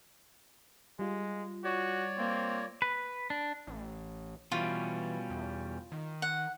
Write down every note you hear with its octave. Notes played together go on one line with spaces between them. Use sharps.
G3 G#3 F4
F#4 C#5 D5
A#3 C4
B4
D4
A1
B2 E3 G3 C#4 F4
E2
D#3
F#5